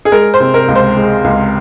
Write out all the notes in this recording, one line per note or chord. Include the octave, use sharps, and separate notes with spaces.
G#4
G#3 A#4
C5
C3
A#4
C#2
C5
G#3
C#2